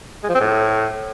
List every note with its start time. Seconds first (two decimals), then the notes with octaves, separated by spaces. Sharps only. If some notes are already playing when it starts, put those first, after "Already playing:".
0.23 G#3
0.29 F3
0.35 C4
0.40 A2